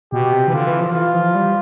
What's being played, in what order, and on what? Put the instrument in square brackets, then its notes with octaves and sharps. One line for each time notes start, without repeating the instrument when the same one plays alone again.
[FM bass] B2 [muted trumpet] G4
[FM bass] C3
E3
[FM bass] D3 [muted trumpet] F4
[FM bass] E3
F3
[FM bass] E3 [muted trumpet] F4
[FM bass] F3
G3